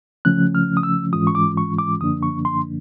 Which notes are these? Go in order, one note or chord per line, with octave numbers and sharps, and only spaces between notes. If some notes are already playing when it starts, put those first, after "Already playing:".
C#3 F3 A3 C#4 F#6
F6
D#6
E6
G#2 E3 G#3 C#4 F4 D#6
C#6
D6
C#6
D6
F#2 D3 F3 A#3 D4 D#6
C#6
C6